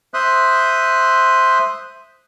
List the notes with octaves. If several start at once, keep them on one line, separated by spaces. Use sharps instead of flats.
C5 E5 C6 D#6 F#6